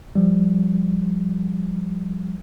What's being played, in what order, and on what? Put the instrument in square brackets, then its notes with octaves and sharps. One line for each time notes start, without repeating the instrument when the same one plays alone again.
[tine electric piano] F3 G3